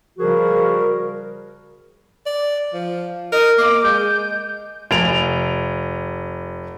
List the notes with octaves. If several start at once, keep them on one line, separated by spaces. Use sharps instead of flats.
C#3 F3 G3 F#4 G#4 A#4
D5
F3
A#4 D#5
A#3 D6
G#3 G6
F1 D7 F7